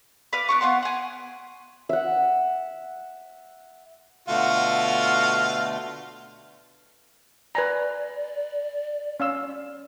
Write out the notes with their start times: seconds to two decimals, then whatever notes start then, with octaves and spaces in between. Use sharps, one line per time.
0.33 B4 D5 F5
0.49 B3 D4 C#6
0.61 B3 F4 F#5 C6
0.83 F#5 G#5
1.89 E5 F#5
4.28 B2 D3 A3 F4 F#4 F5
7.55 B4 D5 G#5 A#5
9.20 C#4 F5 E6